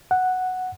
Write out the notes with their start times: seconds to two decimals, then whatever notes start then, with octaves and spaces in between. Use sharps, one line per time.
0.11 F#5